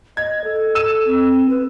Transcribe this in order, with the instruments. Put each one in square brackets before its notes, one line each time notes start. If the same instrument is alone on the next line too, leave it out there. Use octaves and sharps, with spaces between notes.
[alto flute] D#5 [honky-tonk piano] G#6
[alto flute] A4
[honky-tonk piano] E6 D#7 E7
[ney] C4
B4